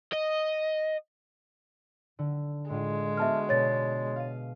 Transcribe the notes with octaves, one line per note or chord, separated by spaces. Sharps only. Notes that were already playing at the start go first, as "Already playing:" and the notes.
D#5
D3
A2 G#3 D4 F4
B3 F#4 E5 A5 F6
B2 C#5 D5 A6
F5 D#7